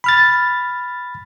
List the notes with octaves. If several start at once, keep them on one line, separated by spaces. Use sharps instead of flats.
B5 F6 A6